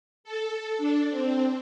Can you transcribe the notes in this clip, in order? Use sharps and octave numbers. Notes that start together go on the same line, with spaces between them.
A4
D4
C4